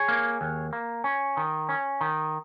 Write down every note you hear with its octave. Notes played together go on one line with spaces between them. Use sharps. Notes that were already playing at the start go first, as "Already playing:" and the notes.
Already playing: G#4 C#5
A#3
D#2
A#3
C#4
D#3
C#4
D#3